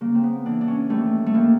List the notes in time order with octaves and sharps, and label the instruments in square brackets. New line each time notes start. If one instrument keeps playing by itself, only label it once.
[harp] C#3 A#3
C4
B3
E3 D4
D4
C#4
D#2 A3
A3
D#2 A#3